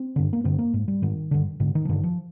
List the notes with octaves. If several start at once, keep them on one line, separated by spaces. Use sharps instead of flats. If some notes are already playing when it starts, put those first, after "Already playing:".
Already playing: C4
G2 D3
A#3
G2 D3 C4
A#3
G#2 G#3
G3
G#2 D#3
G2 D3
G#2 D3
D#3
F3
G2 D3 D#3
F3